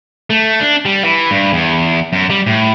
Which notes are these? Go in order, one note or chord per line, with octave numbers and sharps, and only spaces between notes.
A3
D4
G3
E3
G2
E2
F#2
G3
A2